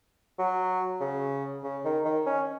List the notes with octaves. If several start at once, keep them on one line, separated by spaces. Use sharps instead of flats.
F#3
C#3
C#3
D#3
D#3
C#4